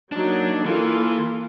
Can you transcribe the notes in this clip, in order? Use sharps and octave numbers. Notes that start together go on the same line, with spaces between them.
F#3 A#3 D4 D#4
E3 A#3 F4 A4